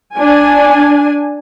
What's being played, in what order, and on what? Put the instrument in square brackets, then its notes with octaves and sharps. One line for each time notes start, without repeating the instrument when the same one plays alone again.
[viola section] D4 G#5